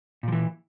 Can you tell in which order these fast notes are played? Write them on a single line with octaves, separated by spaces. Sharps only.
A#2 F3 E3